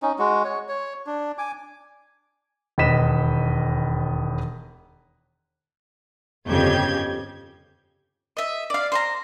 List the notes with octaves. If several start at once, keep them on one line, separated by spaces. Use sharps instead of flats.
C#4 D#4
G#3 F#4
C#5
C#5
D4
G#5 D6
E1 D#2 B4 D#5 B6 E7
G1 F2 C#3 G4 G6 G#6
D#5 E5
D5 F5
C5 F5 A#5